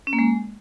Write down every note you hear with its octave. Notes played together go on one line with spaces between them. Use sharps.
C#4
A#3
G#3